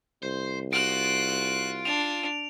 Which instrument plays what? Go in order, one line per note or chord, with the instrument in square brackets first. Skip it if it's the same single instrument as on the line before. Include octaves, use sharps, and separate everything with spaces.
[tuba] C2 [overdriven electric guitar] C5
[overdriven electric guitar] F4 [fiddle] F#4 F#6 [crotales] D7
[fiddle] D4 [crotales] F7